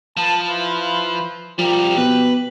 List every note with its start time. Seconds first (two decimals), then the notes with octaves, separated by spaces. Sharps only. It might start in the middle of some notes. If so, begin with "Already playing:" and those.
0.17 F3 B4 A5
0.47 E4 F4 B4
1.59 F3 G3 G4 A#4
1.97 B2 B4